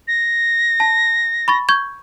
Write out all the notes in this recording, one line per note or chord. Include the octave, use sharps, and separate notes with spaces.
A#6
A5
B5 C#6 A6
C#6 G6 G#6